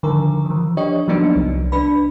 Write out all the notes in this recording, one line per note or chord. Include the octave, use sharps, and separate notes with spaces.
D3 D#3 F3 A#4
E3 F3
D4 G4 C#5 D#5
F3 F#3 A#3 B3 D4 D#4
C2
D4 B4 B5